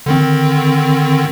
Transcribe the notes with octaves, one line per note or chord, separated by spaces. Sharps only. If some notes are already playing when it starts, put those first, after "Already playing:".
D3 D#3 C4